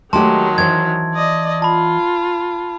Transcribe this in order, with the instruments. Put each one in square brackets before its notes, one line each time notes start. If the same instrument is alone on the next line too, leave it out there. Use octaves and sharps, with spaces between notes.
[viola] D#3 F#3 [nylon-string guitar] G#3 A3 G4 [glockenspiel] A5 C6
[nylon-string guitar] E3 C5 [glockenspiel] G#6
[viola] D5 D#5
[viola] F4 [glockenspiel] A5 B5